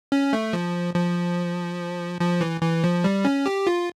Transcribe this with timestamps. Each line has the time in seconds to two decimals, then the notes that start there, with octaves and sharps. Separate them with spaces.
0.12 C#4
0.33 A3
0.53 F3
0.95 F3
2.21 F3
2.41 E3
2.62 E3
2.84 F3
3.04 G3
3.25 C#4
3.46 G4
3.67 F4